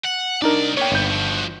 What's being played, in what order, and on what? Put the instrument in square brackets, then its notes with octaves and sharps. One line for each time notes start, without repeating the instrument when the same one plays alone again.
[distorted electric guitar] F#5
[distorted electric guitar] C2 D5 [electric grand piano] D4 D#4 A#4
[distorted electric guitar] A#3 B3 [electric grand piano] C#5 G5
[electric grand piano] G1 G6
[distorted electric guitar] F3 F#4